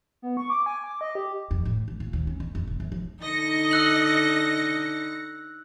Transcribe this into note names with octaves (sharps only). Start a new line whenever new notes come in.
B3
C#6
D6
G#5
D6
D#5
G4
F2
A2
G1
A#2
D#2
C#4
F2
F2
E1
F#2
F3
D3 D#4 D#5 A#6 C#7
E6 F#6 F#7